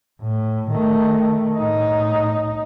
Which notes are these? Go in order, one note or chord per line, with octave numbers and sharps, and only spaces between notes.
A2
D#3 A3
A2 D#4